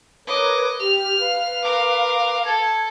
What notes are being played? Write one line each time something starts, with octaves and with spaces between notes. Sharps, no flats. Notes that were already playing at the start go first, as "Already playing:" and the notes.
A#4 B4 C#5 D#5 D6
G4 F6
B4 F5
A#4 D6
A4 G#6